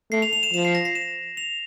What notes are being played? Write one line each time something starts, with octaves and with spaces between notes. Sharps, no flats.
A3 C7
F7
F7
E7
F3 E7
C7
A#6
C7
E7
F7